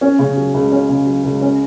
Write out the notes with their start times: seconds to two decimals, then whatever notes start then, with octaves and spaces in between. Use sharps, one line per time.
0.01 C#4
0.19 C#3
0.36 F#3
0.54 C#2
0.72 C#4
0.89 C#3
1.07 F#3
1.24 C#2
1.41 C#4